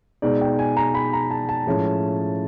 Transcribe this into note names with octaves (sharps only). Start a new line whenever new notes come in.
B2 G#3 B3 D#4 D5
G5
G#5
A#5
B5
A#5
A5
A5
A2 F3 G#3 C#4 E4